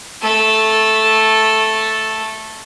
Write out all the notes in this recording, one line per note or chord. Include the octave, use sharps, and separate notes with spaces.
A3 A4